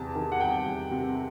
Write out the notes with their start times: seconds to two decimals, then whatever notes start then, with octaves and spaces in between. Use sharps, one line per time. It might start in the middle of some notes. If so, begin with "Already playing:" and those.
Already playing: E2 C3 A5
0.15 D#3
0.32 F#5
0.40 G3 G5
0.66 E2
0.91 C3